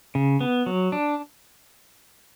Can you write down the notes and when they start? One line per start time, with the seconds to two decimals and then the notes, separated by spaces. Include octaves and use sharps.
0.15 C#3
0.41 B3
0.66 F#3
0.92 D4